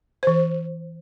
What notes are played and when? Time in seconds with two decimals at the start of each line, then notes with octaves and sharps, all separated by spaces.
0.23 E3 C5